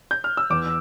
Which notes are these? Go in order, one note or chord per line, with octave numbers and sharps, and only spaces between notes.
G6
F6
E6
E2 D6